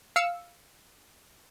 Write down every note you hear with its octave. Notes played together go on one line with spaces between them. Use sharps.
F5 E6 C#7